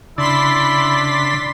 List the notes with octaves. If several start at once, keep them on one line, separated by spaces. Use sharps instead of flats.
C#3 D4 E4 B5 C6 A6 B6